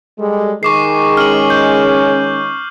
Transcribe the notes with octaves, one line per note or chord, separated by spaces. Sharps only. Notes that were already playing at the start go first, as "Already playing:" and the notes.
G3 G#3 A4
D#3 G#3 G#4 C#6 D6 C7
C#4 F6 F#7
G6